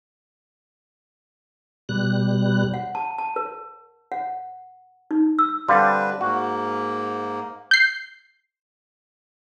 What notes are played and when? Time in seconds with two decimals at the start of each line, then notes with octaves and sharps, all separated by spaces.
1.89 B2 G3 F#6
2.74 F#5
2.95 A5
3.18 A5
3.36 A#4
4.12 F#5
5.11 D#4
5.39 E6
5.69 D3 G3 C4 D4 B4 F5 C6
6.21 G#2 A#3 F#4
7.71 G6 C7